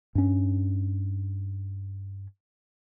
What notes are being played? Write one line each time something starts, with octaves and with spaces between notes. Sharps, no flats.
G2 C#4